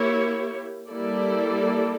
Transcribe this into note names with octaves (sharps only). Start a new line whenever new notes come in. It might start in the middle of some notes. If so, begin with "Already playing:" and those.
Already playing: A#3 E4 G4 C#5
G3 A#3 E4 A4 D5